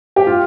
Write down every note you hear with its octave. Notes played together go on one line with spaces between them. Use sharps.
G4
F4